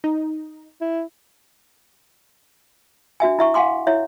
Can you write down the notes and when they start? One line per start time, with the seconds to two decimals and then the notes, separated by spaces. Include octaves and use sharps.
0.04 D#4
0.81 E4
3.20 D4 F#4 E5 G#5
3.39 E4 E5 C#6
3.54 F5 F#5 G#5 C6 D6
3.87 E4 C#5 E5